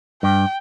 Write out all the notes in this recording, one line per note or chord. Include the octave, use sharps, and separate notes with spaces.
G2 G5